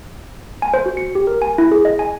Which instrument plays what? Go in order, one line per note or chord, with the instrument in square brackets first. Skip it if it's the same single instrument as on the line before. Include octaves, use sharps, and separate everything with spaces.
[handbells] G#5
C5
F#4
C#7
G4
A#4
G#5
E4
G#4
D#5
G#5